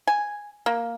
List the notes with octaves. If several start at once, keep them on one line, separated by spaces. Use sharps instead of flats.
G#5
A#3